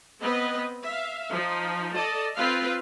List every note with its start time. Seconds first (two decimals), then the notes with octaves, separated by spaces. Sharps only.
0.21 B3 C4 B4 D#5
0.84 E5 F5
1.30 F3 D#4
1.94 A4 D5 D#5 A5
2.36 C4 F4 B4 F5